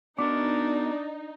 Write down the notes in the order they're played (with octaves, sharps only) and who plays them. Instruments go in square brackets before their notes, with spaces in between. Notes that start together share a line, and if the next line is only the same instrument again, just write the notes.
[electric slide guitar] B3 F#4 A#4 [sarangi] D4 [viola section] D#4 [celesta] D6